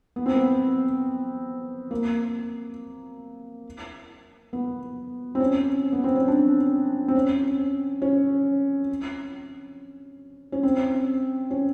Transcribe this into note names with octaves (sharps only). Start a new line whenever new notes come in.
B3
C4
B3
A#3
B3
C4
C#4
B3
C4
C#4
D4
C4
C#4
C#4
C#4
C4
C#4